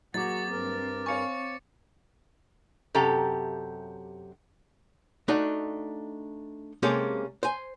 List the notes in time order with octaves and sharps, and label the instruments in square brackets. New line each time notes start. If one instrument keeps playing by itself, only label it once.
[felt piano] F#3 A#3 [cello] F#4 G#4 [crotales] D6 A6
[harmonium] G2 A#4 [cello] C4
[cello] C4 [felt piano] C#5 F5 G#5 [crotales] C#6 C#7
[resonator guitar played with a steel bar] F#2 C3 G4 A4 A#5
[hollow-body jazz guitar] A3 D4 D#4 F#4 D#5
C3 G#3 A#3 C#4 G4 A4
C5 G#5